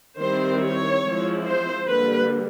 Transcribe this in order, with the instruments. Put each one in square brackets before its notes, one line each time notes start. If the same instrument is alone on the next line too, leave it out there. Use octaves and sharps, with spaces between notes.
[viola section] D#3 G3 C4 E4 C5
C#5
F3 G#3 C4 E4
C5
D3 G3 A#3 B4